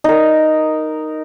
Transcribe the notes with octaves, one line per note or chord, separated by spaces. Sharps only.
D#4 A#4